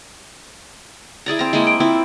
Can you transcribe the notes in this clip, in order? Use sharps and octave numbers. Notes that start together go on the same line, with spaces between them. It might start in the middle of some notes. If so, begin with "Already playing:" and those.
E4 G#4 D5 A#5
C4 A#5
G#3 A#3 E4 D#5
G5
C4 E4 F4